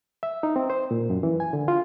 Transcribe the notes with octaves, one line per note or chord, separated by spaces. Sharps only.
E5
D#4
C4
C5
A#2
F#2
E3
G#5
D3
F4